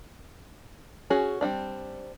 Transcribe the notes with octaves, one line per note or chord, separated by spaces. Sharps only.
C#4 F#4 G#4
G3 C4 D4